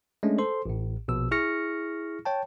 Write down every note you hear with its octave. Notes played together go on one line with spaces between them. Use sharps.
G#3 A3 C#4 D4
A4 C5 C6
A1 A2
A#1 B2 E6
E4 G#4 C#6 F6 A#6 C#7
C#5 G5 A5